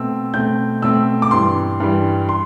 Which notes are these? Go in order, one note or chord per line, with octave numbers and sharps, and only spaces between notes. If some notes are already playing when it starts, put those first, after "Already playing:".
Already playing: B2 A3 C4 E6
B2 A3 C4 G6
B2 A3 C4 E6
D6
G2 E3 G3 C6
G2 E3 G3
C6